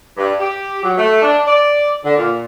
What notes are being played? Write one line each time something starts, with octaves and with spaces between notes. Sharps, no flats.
G2
G4
F#3
A3
D4
D5
D3
A#2